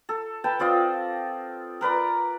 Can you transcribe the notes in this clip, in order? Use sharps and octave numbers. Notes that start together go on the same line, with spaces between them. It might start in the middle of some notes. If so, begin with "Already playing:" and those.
A4
B4 G5 A5
C4 F4 D5 D#5
A#4 B4 D5 A#5